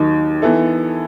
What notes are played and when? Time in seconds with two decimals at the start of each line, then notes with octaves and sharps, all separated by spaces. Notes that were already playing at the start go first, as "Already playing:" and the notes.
Already playing: D#2 D#3 F#3 D#4
0.42 E3 B3 E4 A4